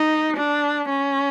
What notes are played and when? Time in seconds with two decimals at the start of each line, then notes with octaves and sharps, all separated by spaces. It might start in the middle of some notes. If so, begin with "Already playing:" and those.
Already playing: D#4
0.36 D4
0.89 C#4